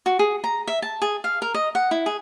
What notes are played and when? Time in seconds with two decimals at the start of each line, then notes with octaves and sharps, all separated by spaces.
0.06 F#4
0.19 G#4
0.44 A#5
0.68 E5
0.82 A5
1.02 G#4
1.24 F5
1.42 A#4
1.54 D#5
1.75 F#5
1.91 E4
2.06 G#4